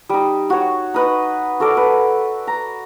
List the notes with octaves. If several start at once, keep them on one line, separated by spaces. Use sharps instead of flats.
G3 D#4
F#4 C#5
D#4 B4 D#5
F#4 A4 A#4 D5
B4
A#5